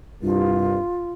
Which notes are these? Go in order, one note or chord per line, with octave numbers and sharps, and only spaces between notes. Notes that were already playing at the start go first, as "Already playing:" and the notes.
C2 G2 F4